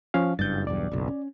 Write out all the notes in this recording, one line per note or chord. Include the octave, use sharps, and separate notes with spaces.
F3 C#4 F5
F#1 G2 G6 A6
B1 E2 G2 D5
F#1 B1
C#4